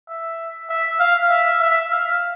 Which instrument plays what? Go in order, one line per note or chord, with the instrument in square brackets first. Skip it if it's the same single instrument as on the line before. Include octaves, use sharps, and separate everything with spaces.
[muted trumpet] E5
E5
F5
E5
E5
F5